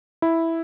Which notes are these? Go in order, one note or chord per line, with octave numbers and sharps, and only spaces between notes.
E4